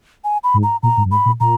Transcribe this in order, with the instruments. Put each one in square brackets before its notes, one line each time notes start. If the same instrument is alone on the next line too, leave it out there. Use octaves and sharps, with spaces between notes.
[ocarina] G#5
B5
[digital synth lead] G#2
[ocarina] A#5
[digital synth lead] A#2 [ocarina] A#5
[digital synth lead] G#2
F#2
[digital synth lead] G#2 [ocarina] B5
[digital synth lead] A#2
[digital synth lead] A#2 [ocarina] A#5